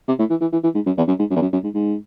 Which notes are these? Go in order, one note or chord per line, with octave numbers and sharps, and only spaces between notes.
C3
A2
E3
E3
E3
E3
G#2
F#2
E2
F#2
G#2
F#2
E2
F#2
F#2
G#2
G#2